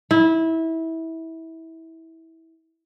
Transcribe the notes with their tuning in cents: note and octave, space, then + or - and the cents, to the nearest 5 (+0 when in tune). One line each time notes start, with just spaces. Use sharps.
E4 -20